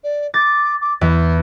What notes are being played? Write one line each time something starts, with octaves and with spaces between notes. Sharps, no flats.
D5
D6 A6
D6
E2 E4